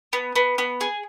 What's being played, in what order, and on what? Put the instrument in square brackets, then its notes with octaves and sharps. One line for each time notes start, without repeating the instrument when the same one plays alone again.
[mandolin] B3
B3
B3
G#4